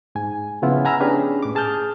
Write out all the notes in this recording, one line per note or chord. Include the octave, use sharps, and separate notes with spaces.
G#2 G#5
C#3 F3 B3 E4 F4
F#5 G#5 A#5 B5 E6 F6
B3 C#4 D4 G4 G#4 B4
A2 D6
G#4 A5 D#6 F6 G6